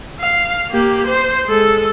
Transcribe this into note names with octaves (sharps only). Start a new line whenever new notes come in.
F5
A#3 G4
C5
G#3 A4